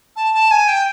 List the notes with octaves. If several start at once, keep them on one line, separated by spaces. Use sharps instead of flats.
A5
A5
G#5
G5